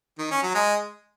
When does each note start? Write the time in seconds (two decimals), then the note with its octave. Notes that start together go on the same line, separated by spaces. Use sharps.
0.19 D#3
0.31 C#4
0.43 F#3
0.55 G#3